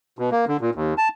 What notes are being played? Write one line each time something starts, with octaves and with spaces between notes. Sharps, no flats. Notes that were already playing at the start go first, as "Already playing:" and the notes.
B2
A#3
D3
A#2
D#2
A5